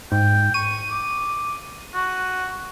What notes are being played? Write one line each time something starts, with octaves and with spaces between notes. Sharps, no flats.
G#2 G5
C#6 D#7
D6
F#4